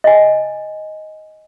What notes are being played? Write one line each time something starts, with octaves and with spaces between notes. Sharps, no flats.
D#5 G#5